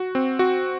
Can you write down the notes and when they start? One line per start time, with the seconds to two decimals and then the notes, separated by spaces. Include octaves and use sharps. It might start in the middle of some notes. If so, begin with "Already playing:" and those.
Already playing: F#4
0.15 C4
0.39 F#4